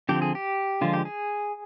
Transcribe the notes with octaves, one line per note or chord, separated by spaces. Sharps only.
D3 F3 C4 G4
G#4
G4
D3 F3 G#3 F4
G4
G#4